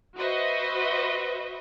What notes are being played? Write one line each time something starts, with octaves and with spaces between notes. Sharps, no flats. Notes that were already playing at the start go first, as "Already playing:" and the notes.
F#4 B4 C5 D#5 E5